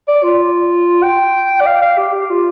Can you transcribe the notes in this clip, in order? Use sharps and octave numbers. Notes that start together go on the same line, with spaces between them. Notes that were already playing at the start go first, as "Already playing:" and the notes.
D5
F4
G5
D5
F5
F5
G4
G4
F4